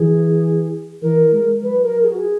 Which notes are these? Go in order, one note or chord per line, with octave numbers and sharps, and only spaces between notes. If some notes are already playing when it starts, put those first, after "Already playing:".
Already playing: E3 G#4
E3 A#4
G#3
F#3 B4
A#4
G#4
F#4
G#4